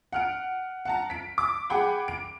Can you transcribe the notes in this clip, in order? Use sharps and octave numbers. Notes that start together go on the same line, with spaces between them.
F#5 F6 D7
F#5 A5 A#5
B6 D7
D6
G#4 F#5 G5 B5
D7